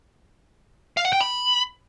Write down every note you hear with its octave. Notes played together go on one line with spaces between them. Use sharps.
F5
F#5
G5
B5